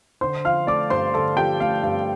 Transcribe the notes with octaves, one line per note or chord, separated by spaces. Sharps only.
D3 C5 C6
F3 F5 F6
A3 D5 D6
G2 C5 C6
D3 A4 A5
F3 G4 G5
A3 F5
G2 F5